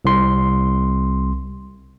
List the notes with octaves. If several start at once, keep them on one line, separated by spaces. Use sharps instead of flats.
C2 C6